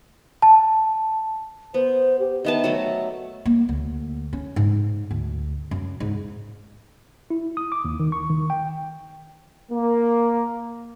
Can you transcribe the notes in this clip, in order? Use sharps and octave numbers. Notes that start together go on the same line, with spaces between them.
A5
B3 C5
G4
D#3 B3 E5 A5
F#3 A3
A#3
D2
C#4
G#2
D2
F#2
G#2
E4
D#6
D6
D#2
D#3
C#6
D#3
G5
A#3